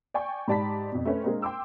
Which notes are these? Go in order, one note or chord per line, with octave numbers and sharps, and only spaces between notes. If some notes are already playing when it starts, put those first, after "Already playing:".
D5 G5 G#5 C#6
G#2 G4 D5 A5 B5 B6
F2 B2
A3 C4 C#4 B4
G#3 A#3 C4 D4 A#4
G5 C6 D6 E6